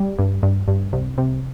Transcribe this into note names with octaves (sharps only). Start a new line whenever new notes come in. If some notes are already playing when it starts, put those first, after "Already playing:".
Already playing: G3
G2
G2
G2
C2
C3